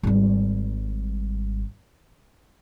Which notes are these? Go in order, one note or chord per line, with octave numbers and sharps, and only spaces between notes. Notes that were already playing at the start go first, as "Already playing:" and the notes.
G#1 G3